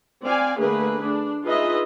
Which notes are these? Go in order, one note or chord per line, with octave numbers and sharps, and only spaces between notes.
C4 D5 F5 G#5
D3 A3 A#3 G#4 B4
D4
D#4 F4 G#4 B4 D#5 E5